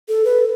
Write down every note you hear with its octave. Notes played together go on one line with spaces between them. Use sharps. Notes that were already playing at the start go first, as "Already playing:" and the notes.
A4
B4